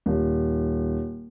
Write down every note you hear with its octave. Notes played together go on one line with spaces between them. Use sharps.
D#1